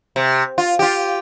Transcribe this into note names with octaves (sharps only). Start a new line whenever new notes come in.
C3
F4
F4 G4